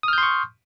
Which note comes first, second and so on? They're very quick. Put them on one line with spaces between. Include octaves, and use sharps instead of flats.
D#6 F6 G6 C6 C#6